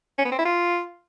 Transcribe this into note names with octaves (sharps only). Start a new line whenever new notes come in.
C#4
B3
C4
E4
F4